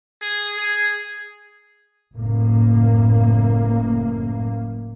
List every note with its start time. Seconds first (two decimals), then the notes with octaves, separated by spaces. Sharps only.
0.22 G#4
0.58 G#4
2.14 F#1 A2 A#3